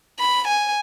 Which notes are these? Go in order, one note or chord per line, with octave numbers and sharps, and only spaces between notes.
B5
G#5